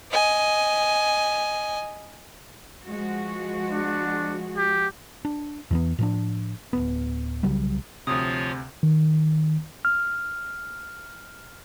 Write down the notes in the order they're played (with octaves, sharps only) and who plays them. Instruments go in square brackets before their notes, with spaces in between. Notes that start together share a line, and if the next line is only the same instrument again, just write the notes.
[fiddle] D#5 G#5
[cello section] F3 G#3 F#4
[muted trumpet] D4
G4
[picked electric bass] D4
E2 E3 B3
A2 F3 D4
D1 G#1 B3
C2 C#3 F#3 G3
[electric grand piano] D2 C3 [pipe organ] F3 F4 C#5 [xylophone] D#6
[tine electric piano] D#3
F6